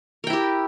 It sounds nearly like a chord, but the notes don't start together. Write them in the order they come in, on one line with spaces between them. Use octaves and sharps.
A#4 G5 E4 G4